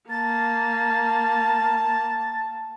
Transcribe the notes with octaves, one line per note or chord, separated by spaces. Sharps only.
A#3 A5 A6